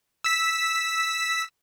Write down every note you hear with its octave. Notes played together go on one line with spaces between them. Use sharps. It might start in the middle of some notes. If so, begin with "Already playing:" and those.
E6 B6